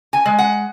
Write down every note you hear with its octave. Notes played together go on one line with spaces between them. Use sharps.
G#5
G#3
F#5